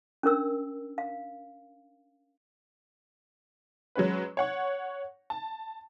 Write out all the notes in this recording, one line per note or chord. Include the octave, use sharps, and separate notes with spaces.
C#4 D4 A#4 E6
F5
F#3 G#3 C#4 B4
C#5 F#5 C#6
A5